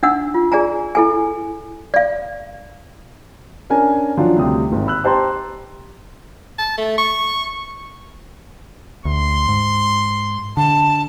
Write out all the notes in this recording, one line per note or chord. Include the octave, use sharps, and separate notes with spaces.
D4 D#4 F#5 E6
F4
G#4 D5 G#5 A#5
E4 A4 G#5
D5 F5
C#4 D4 A#4 G#5
D#3 F3 F#3 D4 F4
D2 C3 G3 G4 D#6
G#1
B5 E6 F#6
G4 C5 A5 A#5 C6
A5
A3
C#6
D2 C6
G#2
D3 A5